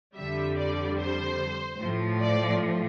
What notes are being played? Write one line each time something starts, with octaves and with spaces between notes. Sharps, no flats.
F2 D3 G3 E5
D5
C5
A2 F3
D5